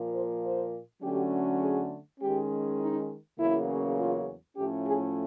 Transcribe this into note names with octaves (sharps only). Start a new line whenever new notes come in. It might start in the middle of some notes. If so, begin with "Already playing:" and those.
Already playing: A#2 F3 A#3
C5
C5
D3 F#3 A3 C#4 G4
G#4
D#3 G#3 C#4 G4
D#4
E2 C#3 F#3 A#3 C#4 E4
F4
A2 F3 A3 C#4 G4
G#4